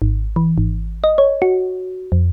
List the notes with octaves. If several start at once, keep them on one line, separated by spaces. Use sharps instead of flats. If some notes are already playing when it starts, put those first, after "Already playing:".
G#1
E3
G#1
D#5
C#5
F#4
F2